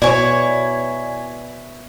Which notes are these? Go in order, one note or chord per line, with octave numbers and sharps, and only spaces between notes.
B2 E4 C#5 D5 G#5